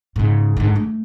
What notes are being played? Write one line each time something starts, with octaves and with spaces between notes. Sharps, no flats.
G#2 C#3
G#2 D3
A3